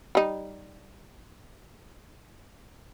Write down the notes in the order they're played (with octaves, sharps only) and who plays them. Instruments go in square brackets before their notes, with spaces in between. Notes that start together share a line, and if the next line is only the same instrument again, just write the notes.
[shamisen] G3 D#4